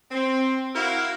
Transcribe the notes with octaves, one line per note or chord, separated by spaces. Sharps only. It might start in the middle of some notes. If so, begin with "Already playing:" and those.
C4
E4 F#4 A#4 F5